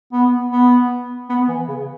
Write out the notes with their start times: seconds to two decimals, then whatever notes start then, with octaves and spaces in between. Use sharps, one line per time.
0.12 B3
0.51 B3
1.29 B3
1.48 E3
1.68 C#3